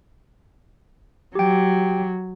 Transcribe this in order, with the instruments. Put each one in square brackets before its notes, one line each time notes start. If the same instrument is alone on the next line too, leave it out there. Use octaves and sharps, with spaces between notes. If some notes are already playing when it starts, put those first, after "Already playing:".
[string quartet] F#3 [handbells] G4 G5